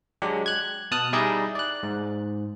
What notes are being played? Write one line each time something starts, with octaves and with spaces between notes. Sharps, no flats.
F#3 G#3 D4 G4
F#6 G#6
B2 A5 D#6 F6 F#6
G3 D#4 E4 G#4 D5 D#5
D5 F#6
G#2